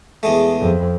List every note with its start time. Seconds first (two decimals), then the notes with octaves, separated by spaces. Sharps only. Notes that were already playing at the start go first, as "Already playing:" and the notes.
0.23 E2 G#3 A3
0.61 F2